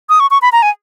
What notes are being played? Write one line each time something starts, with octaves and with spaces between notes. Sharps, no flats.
D#6
C#6
C#6
B5
A#5
G#5